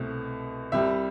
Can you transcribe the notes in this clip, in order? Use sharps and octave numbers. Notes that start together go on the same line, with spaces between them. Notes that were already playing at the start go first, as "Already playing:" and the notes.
Already playing: C2 B2 A3 C4
C2 C3 G3 E5